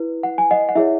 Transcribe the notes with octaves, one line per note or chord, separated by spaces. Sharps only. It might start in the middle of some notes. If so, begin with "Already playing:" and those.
Already playing: E4 B4
F#5
G#5
D#5 F#5
F#5
E4 G#4 C#5 E5